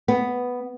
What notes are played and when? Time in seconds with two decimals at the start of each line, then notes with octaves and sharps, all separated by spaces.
0.08 B3